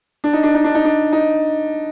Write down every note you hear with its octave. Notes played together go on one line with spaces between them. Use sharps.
D4
D#4
D4
D#4
D4
D#4
D4
D#4